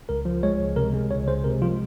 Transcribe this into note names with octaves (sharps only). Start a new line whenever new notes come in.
C#2 A#4
F3
G#3 C#5
C#2
C3 A#4
G#3
C#2 C#5
G#3 C5
C3 A#4
F3 F4